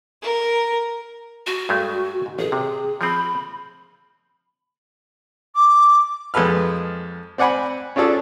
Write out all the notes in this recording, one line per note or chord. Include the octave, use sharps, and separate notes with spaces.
A#4
F#4
G2 G#3 A3
G#2
A1 G#4
C3
F3 C4 B5
D6
F2 G#3 A4 B4 F6
C4 D5 F#5 G#5 B5
C#4 D4 F4 G#4 A4 D5